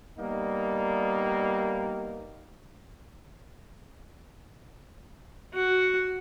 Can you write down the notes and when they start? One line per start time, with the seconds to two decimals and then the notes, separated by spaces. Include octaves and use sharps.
0.18 G3 A#3 B3 D#4
5.54 F#4